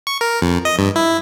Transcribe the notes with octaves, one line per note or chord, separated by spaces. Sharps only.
C#6
A#4
F2
D#5
G2
E4